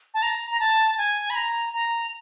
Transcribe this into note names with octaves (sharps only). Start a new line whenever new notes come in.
A5
A#5
A#5
A5
G#5
B5
A#5
A#5